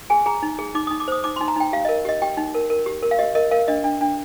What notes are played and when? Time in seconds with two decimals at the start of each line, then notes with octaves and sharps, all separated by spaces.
0.10 G#4 G#5
0.26 G#4 A#5
0.43 D#4
0.59 G#4
0.75 D#4 D6
0.87 D#6
0.91 D#4
1.00 D6
1.08 C5 D#6
1.24 D#4 D6
1.36 C6
1.41 D#4
1.48 A#5
1.56 D#4 G5
1.73 G4 F5
1.85 D#5
1.89 A#4
2.05 G4 D#5
2.22 G4 G5
2.37 D#4
2.55 A#4
2.70 A#4
2.86 G4
3.03 A#4
3.11 F5
3.19 G4 D#5
3.35 A#4 D#5
3.51 A#4 F5
3.68 D4 D#5
3.84 D4
4.01 D4